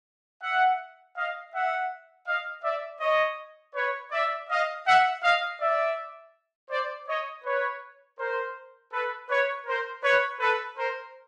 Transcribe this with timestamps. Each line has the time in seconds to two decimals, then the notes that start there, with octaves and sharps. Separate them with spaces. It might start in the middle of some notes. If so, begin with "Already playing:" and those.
0.41 E5 F#5
1.16 D#5 F5
1.52 E5 F#5
2.26 D#5 F5
2.63 D5 E5
3.00 C#5 D#5
3.75 B4 C#5
4.11 D5 E5
4.49 D#5 F5
4.85 E5 F#5
5.22 D#5 F5
5.60 D5 E5
6.70 C5 D5
7.07 C#5 D#5
7.44 B4 C#5
8.18 A#4 C5
8.92 A4 B4
9.29 B4 C#5
9.66 A#4 C5
10.03 B4 C#5
10.40 A4 B4
10.77 A#4 C5